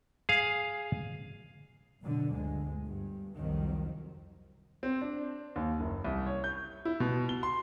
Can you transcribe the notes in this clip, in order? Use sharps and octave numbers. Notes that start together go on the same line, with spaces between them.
G#4 F5
F#2 B2 D3
G1 D2 G#3
G2
C2 F2 D#3 F#3
C4
D4
D#2
F#1
C2
C#5
G6
E4
B2
G7
C6